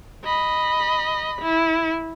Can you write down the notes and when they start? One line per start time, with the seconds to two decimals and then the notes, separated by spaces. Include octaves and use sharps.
0.25 D#5 B5
1.42 E4